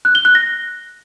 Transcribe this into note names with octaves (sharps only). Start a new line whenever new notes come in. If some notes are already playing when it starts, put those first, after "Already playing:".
F#6
G7
F#6
A#6